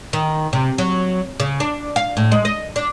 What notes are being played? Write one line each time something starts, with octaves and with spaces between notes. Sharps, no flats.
D#3
C3
F#3
C#3
D4
F5
A2
G#3
D#5
D4